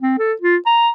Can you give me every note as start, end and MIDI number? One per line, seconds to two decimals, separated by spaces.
0.01 0.16 60
0.19 0.34 69
0.42 0.57 65
0.66 0.91 82